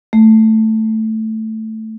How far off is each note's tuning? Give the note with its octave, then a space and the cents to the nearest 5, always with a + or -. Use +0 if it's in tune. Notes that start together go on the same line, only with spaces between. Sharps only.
A3 +0